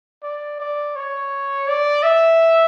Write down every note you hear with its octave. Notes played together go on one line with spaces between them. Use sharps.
D5
D5
C#5
D5
E5